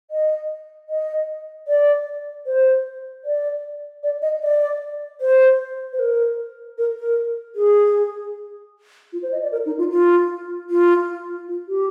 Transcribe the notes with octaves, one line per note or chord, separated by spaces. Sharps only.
D#5
D#5
D5
C5
D5
D5
D#5
D5
C5
C5
A#4
A#4
A#4
G#4
F4
C5
D#5
D5
A#4
D#4
F4
F4
F4
F4
G4